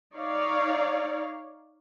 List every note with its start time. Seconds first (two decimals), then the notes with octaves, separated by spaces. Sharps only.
0.14 D#4 C#5 D5 F5